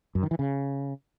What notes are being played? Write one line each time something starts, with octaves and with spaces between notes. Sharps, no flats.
F#2
D#3
E3
C#3